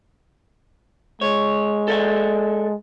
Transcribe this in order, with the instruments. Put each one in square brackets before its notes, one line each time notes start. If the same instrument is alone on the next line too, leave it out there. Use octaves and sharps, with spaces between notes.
[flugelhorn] G#3 [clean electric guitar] C#5
[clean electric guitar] A4 D5 E5